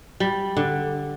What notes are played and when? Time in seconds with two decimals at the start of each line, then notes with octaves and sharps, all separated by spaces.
0.20 G3
0.57 D3